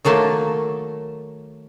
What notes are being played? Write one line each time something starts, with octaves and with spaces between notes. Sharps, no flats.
D#3 F#3 A3 A#3 A5